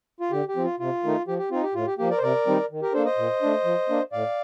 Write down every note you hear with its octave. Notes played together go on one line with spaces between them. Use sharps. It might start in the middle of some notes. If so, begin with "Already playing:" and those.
F4
D3 G4
G4
F3 C4
F4
C3 F4
D#3 A3 D#4
F3 G4
G4
C4 D#4 F4
G4
A2 F4
G4
F3 A#3 G4
A#4 D5
C5
C3 A#4 D5
D#3 G3 C4 D#4
D#3
G4 A#4
A#3 D4 A4 C5
C5 D#5
A#2
A3 D4
F3
A#3 D4
A2 D5 F5